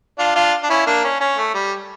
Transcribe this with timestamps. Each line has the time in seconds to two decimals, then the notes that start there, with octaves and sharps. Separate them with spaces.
0.18 D4 F4
0.35 D4 F4
0.63 D4
0.70 C#4 E4
0.86 A#3 D4
1.04 C#4
1.21 C#4
1.37 A3
1.54 G3